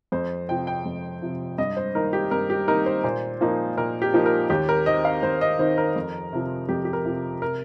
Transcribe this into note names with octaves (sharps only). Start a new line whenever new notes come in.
F2 C5
C3 F3 G5
G5
F2
C3 F3
G2 D#5
C5
D#3 A#3 D#4 A#4
G4
G2 A#4
G4
D#3 A#3 D#4 A#4
C5
A#2 C5
F3 A#3 D#4
A#2 A#4
G4
F3 A#3 D#4
A#4
D#2 G4
A#4
D#3 C4 D#4 D#5
F5
D#2 C5
D#5
D#3 C4 D#4 C5
A#4
F2
C3 F3
F2 G4
G4
A#4
C3 F3
C3 A#4